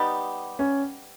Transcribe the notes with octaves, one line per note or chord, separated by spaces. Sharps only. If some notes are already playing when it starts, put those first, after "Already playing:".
Already playing: G3 B3 D#4 G4
C#4